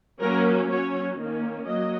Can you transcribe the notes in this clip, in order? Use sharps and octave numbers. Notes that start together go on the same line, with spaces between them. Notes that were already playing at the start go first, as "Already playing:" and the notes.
F#3 A#3 C#4 A#4
F#3 C#4 C#5
D#3 A#3 C#4
F#3 A#3 D#5